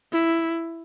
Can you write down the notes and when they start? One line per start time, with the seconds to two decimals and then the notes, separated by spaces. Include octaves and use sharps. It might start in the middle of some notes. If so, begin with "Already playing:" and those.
0.12 E4